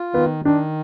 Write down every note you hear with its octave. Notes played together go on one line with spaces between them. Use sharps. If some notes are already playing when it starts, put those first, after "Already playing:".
Already playing: F4
D#3 B3
D#3 D4